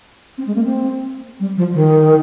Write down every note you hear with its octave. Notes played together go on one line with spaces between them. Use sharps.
C4
G#3
A#3
C4
G3
F3
D#3